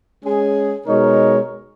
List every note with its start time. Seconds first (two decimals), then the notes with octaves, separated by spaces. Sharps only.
0.23 G#3 C#4 G#4
0.86 B2 G#3 D#4 A#4 C#5